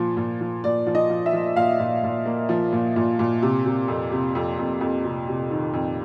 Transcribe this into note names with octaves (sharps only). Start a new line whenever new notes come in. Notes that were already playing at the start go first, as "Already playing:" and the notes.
Already playing: A#2 F3
A#2
F3
A#2 D5
F3
D#5
F3
E5
F3
A#2 F5
A#2
A#2
A#3
F3
A#2
A#2
A#2
C3
C3
F2
C3
F2
F2
F2
C3
C3
D#3
F2